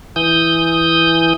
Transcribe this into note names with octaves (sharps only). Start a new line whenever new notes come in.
E3 D#6 G6